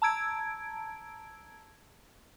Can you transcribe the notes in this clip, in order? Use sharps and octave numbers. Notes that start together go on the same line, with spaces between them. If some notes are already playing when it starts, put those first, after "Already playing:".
A5 A#5 E6 G#6 D7